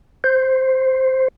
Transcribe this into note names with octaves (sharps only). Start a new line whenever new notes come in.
C5